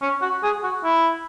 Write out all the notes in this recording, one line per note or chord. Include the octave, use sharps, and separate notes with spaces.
C#4
F#4
G#4
F#4
E4